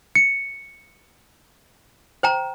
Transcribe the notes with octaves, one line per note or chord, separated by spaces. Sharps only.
C#7
C5 G5 A#5